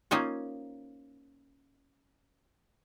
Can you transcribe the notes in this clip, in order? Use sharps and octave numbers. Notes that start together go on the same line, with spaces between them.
A#3 C#4 D#4 F4 C5 G#5